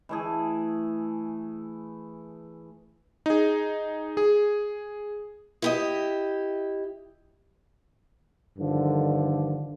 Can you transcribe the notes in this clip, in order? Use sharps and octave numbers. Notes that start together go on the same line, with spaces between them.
E3 A3 G#4
D#4 G#4
G#4
E4 G4 D#5
G2 D3 D#3 F3